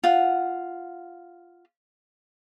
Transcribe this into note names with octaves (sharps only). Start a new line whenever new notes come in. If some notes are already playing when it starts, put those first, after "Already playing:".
F4 F#5